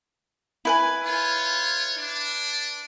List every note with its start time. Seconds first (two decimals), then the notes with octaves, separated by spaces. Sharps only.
0.65 E4 B4 G#5
1.03 F4 C#5
1.98 D4